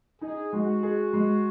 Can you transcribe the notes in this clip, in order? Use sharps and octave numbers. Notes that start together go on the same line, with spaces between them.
D#4 G#4
G#3 F#4
G#4
G#3